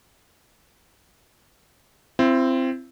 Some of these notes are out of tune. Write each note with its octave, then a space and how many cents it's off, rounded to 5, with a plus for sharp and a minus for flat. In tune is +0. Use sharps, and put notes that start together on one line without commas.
C4 +0 E4 +40